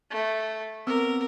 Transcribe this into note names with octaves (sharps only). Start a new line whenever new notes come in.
A3
B3 C4 A#4 E6